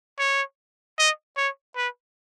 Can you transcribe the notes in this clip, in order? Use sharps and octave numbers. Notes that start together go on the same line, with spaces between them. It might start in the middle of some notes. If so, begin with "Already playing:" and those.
C#5
D#5
C#5
B4